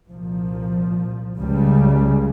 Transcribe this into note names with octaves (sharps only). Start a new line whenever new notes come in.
C2 A#2 F3
C#2 C#3 G3